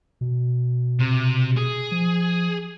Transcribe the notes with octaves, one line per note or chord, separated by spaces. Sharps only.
B2
C3
G#4
F3